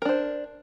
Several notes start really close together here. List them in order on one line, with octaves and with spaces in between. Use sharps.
A#4 D4 C5